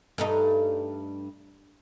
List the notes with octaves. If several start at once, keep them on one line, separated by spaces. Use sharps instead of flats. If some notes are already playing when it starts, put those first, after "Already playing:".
G2 A3 D#4